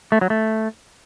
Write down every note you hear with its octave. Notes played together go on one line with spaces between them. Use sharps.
A3
F#3
A3